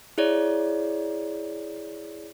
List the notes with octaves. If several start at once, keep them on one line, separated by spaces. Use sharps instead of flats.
E4 G#4 C#5 D5